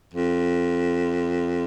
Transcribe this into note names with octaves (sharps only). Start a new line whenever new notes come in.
F2